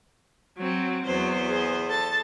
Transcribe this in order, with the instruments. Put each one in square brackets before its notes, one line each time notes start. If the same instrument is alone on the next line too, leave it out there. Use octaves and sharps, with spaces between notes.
[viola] F#3 C4
[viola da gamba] E2 B3 C5 [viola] F#3
[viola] G#4
A4 A5